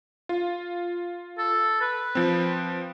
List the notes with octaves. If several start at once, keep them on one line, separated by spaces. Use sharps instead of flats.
F4
A4
B4
F3 C4